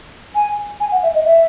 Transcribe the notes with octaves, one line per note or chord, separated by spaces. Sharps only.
G#5
G#5
F#5
E5
D#5
E5